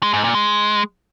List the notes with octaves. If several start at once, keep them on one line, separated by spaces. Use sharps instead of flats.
G#3
G#2
A#2
G#3